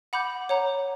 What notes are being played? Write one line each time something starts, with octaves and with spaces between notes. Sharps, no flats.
F#5 B5 D6 G6
C#5 F#5 A#5